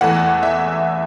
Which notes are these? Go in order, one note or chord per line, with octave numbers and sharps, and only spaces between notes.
E2 E3 A3 F#5
E5